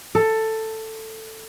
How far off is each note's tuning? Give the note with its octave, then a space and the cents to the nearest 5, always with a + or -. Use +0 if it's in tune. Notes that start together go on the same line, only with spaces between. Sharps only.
A4 +10